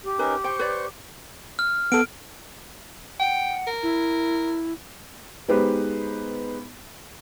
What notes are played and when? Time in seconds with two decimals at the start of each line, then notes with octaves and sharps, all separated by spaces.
0.04 G4
0.19 C#4 D#4 A#4 B4
0.44 C5 G5 C#6
0.59 B4 C#5 D5
1.59 F6
1.92 B3 A4 F6 D7
3.19 F#5 G5
3.67 A#4
3.83 E4
5.48 G#3 B3 D#4 G4 B4 C5